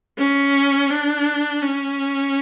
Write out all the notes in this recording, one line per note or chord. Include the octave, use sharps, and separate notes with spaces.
C#4
D4
C#4